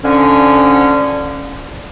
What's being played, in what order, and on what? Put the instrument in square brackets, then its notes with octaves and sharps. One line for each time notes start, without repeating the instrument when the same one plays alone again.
[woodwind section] D3 F3 C#4